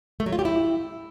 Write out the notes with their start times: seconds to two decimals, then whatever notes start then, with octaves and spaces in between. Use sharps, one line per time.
0.20 A3
0.26 F#3
0.32 F4
0.39 G4
0.45 E4